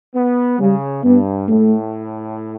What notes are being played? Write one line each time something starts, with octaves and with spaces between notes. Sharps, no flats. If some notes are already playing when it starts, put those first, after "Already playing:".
B3
C#3 G3
G2 B3
A2 A3